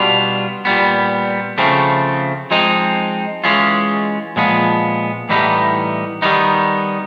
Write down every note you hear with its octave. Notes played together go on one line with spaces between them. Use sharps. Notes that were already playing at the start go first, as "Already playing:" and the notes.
Already playing: B2 G3 B3 D4 F4
A#2 G3 B3
C#3 F3 A3 C4
F3 G#3 C4 D#4
E3 G#3 C#4 F4
A#2 F3 G#3 B3
A2 E3 G3 B3 D#4
D#3 G3 B3 D#4